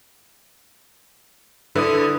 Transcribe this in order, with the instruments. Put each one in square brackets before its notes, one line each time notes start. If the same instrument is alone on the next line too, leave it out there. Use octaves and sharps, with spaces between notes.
[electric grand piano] D3 E4 D#6 [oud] D4 A4 B4